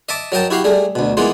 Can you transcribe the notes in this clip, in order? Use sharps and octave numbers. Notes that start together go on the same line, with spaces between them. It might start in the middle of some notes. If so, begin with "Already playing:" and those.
D#5 E5 A5 D6
F#3 A#4 D#5 G5 A5
E4 F#4 G4 F5
G3 A3 G#4
D2 B2
E3 G#3 A#3 B3 F4